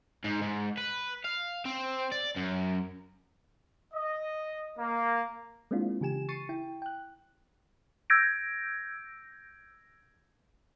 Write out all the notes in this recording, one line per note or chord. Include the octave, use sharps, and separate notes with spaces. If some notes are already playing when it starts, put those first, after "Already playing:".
G#2
G#2
B4
F5
C4
D5
F#2
D#5
A#3
G#3 A#3 C4 D4 E4 F4
C#3 E3 G4 G#5 E7
C#6 A6 C7 C#7 D#7
E4 G5
G5 F#6
E6 G6 G#6 A#6 D7